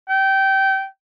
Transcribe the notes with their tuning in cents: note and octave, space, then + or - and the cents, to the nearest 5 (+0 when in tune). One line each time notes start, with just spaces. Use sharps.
G5 -20